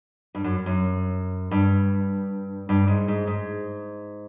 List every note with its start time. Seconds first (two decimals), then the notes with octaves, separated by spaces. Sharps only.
0.35 G2
0.44 F#2
0.66 F#2
1.51 G2
2.69 G2
2.87 G#2
3.08 G#2
3.27 G#2